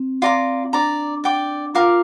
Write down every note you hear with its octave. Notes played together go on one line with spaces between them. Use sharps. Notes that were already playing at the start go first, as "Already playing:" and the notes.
Already playing: C4
F4 D5 A#5 D6
D4 D5 A#5 D6
D5 G5 D6
F4 A#4 F5 D6